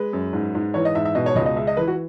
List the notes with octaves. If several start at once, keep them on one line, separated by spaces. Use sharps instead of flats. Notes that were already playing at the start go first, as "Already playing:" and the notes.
Already playing: G#3 B4
F#2
G#2
G#2
E3 C#5
D#5
G#2 E5
E5
B2 D#5
C#5
C#2 D#5
D#5
G#3 E5
D#5
E3 B4
F#4